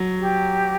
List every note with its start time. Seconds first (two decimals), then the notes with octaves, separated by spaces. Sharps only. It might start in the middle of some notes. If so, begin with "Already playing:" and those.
Already playing: F#3
0.20 G4